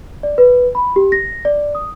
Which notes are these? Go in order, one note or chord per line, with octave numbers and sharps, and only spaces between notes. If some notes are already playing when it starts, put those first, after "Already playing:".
D5
B4
B5
G4
A#6
D5
D#6